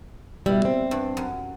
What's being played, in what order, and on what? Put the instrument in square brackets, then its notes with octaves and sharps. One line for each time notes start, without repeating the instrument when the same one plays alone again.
[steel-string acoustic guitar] B2 G3 [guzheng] E4
[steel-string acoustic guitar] C4
[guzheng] G2
F#2